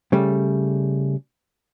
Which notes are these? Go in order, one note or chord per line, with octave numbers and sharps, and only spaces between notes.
C#3 G3 A3